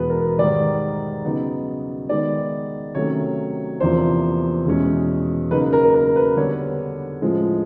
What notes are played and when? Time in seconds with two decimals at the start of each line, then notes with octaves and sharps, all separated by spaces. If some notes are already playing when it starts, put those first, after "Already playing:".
Already playing: E2 B2 G#3 B3 B4
0.10 A#4
0.38 G#2 D#3 G3 D5
1.24 C#3 F#3 B3 D#4
2.09 D#3 G#3 B3 D#4 D5
2.94 C3 D#3 F#3 A3 C#4 C#5
3.80 E2 C3 F3 A#3 D4 C5
4.66 E2 B2 G#3 C#4
5.51 C#3 F#3 A#3 D#4 B4
5.73 A#4
5.94 A#4
6.16 B4
6.37 D3 G3 B3 C#5
7.22 A2 F3 G#3 C#4